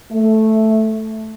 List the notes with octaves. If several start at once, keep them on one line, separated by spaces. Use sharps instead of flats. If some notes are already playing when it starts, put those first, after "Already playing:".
A3